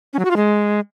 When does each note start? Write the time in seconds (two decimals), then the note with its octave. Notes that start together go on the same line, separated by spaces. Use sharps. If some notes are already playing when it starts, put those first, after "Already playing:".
0.13 C#4
0.19 F#3
0.25 F#4
0.31 F4
0.36 G#3